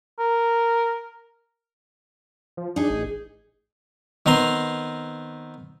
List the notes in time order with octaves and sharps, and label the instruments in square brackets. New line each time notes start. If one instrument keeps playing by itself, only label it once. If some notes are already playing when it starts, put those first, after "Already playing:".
[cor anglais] A#4
[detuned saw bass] F3
[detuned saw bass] D4 [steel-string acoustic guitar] D#4 G#4
[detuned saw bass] A1
[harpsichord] D#3 B3 C4 A#5 C6